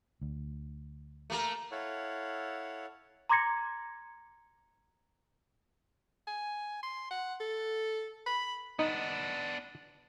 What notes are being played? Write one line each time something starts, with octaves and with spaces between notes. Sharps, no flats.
D2
A3 A#3 A#4
E4 A4 C#5 F5 F#5
A#5 C6 D6 G#6 A#6 C#7
G#5
C6
F#5
A4
B5
B3 D4 D#4